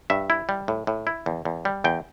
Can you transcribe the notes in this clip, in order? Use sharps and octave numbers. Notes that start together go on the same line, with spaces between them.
G2 E5
E4
G3
A2
A2
E4
E2
E2
G3
E2 G5